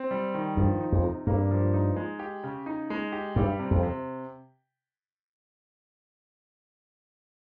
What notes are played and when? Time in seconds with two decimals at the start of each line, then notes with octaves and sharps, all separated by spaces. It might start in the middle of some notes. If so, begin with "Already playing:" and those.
Already playing: C4
0.11 G3
0.34 D#3
0.57 G2 F3
0.81 D#4
0.92 F2
1.03 C3
1.27 G2 A#3
1.51 F3
1.73 D#4
1.96 G#3
2.19 G4
2.43 C#3
2.66 D#4
2.90 G#3
3.12 G4
3.36 G2 G3
3.59 C3
3.71 F2
3.83 C3